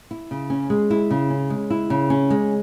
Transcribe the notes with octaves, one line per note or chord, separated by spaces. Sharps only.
E4
C#3
C#4
G#3
E4
C#3
C#4
G#3
E4
C#3
C#4
G#3